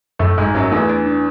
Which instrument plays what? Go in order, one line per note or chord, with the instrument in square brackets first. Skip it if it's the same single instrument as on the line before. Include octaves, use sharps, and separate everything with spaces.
[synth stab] F#2 [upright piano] A2 A3
[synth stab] G#1 [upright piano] G#2 G#3
[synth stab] G#1 [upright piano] F#2 F#3
[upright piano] E2 E3 [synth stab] A3
[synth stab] D4
D4